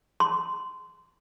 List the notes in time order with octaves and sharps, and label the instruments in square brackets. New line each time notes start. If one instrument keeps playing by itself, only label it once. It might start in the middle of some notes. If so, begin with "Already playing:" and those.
[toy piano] C6